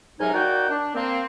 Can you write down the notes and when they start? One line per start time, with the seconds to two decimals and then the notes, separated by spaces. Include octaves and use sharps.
0.19 G#2 C3 F#3 D#4 A#4 G#5
0.34 A#3 D#4 F#4 D5 F#5 G5
0.69 D4
0.95 A#3 C4